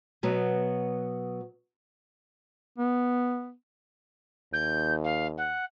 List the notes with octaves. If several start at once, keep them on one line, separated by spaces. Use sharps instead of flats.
B2 F#3 B3
B3
D#2 G6
F5
F#5